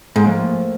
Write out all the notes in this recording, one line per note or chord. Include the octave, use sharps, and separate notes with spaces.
G#2
A2 F3 A#3